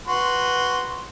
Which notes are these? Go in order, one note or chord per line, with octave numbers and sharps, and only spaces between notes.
F#4 B4 C6